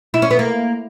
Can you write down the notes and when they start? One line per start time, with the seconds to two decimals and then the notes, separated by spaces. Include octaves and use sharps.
0.14 E4
0.22 C#4
0.31 B3
0.39 A#3